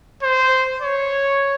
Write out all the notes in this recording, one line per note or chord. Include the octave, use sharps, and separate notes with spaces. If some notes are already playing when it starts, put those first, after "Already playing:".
C5
C#5